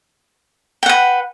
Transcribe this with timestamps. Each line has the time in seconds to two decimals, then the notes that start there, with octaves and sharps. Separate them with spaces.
0.83 G5
0.86 F#5
0.89 B4